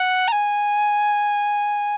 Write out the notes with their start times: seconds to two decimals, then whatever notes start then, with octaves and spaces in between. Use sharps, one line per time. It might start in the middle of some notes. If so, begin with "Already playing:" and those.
Already playing: F#5
0.28 A#5
0.32 G#5